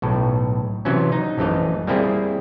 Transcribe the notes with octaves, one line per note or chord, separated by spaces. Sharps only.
B1 A2
C3 E3 F#3 C#4
D#4
A#1 F#2 E3 A3 D#5 F5
G3 A#3 C4 E4 G#4